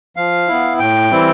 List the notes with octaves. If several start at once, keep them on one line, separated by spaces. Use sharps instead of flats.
F3 F5
B3 E4
A2 G5
E3 G3 C4 E4